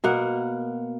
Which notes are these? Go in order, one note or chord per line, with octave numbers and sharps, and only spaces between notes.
B2 A#3 F#5